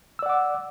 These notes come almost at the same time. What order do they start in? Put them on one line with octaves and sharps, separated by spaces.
E6 D5 F#5 D6